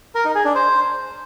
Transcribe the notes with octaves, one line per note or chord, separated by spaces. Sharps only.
A#4
D#4
G#4
D4
C5